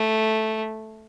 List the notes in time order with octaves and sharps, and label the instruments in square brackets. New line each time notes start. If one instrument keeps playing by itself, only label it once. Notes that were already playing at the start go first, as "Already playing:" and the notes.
Already playing: [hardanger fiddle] A3